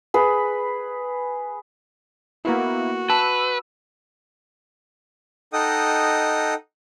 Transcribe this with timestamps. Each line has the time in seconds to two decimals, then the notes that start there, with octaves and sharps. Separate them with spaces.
0.14 G#4 B4
2.45 A#3 B3 E4 F#4
3.10 B4 A5 E6
5.53 D#4 A4 D#5 F#5 G5 D#6